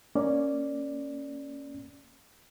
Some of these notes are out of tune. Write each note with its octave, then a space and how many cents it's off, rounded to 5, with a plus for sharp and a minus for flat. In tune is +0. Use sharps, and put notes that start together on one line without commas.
A#3 +0 C#4 +0 D5 +0